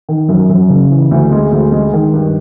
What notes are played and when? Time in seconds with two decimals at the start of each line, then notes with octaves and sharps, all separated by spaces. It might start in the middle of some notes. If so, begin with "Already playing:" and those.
0.09 D#3
0.29 F#2
0.50 F#2
0.69 C#3
0.90 E3
1.11 D2
1.31 G#3
1.52 D2
1.72 G#3
1.93 D#3
2.14 G2